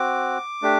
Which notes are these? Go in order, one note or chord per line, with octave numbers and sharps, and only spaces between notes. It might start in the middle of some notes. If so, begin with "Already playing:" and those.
Already playing: C4 F#4 D6
A3 D4 G4